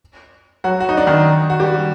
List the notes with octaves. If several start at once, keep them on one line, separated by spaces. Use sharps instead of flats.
F#3 F#4
F#4
D#4
D4
D#3 D#4
F#4
G3 G4